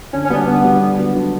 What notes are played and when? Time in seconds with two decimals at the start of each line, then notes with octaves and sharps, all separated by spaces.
0.13 D3 C#4
0.25 C#4
0.30 G3 B3 D4
0.47 D3 B3
0.64 G3 D4
0.81 D3
0.98 F#3 B3 F#4
1.16 D3